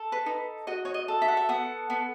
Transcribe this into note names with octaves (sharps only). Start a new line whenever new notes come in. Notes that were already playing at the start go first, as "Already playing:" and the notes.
Already playing: A4
B4
D#4
F#4 D#5
C#5
D#5
A4
E5
F#5
E5
B3 F#5
B3